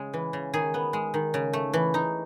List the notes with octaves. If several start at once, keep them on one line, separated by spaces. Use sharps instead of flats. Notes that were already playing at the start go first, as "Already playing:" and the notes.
Already playing: C#3 G#3 G#4
E3
C#3
D#3 G#4
B3
G#3
D#3
C#3
A3
E3
D#4